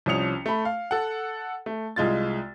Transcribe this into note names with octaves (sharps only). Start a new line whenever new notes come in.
C2 F3 C#4 D#6 C#7 F7
A3 B5
F5
A4 F#5
A3
C2 G#3 F4 A6